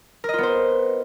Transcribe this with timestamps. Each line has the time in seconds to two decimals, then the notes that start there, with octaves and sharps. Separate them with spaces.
0.24 A#4
0.29 D#5
0.34 F4
0.38 B3
0.43 C5